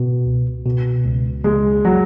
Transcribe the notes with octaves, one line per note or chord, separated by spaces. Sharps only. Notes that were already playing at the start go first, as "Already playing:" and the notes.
Already playing: B2
C#2
B2
C#2
C#2 G#3
F#3